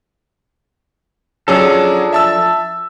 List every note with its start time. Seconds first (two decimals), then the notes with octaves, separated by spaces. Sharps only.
1.48 F3 F#3 C#4 D4 G#4 A4
2.13 E5 A5 E6